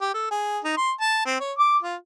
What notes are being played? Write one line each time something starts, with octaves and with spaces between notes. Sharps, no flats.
G4
A4
G#4
D#4
C6
A5
C4
C#5
D6
F4